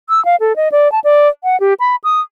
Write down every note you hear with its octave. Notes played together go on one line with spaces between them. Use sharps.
E6
F5
A4
D#5
D5
A5
D5
F#5
G4
B5
D#6